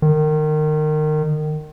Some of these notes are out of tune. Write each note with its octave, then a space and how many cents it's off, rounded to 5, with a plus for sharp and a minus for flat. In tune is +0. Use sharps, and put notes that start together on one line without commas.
D#3 -25